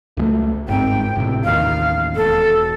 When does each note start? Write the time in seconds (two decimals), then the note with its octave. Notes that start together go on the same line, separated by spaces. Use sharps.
0.17 C#2 G#3 A3
0.68 G1 G#2 C4 G5
1.16 G#1 A2 C3
1.44 A1 D#2 D#3 F5
2.16 E1 A4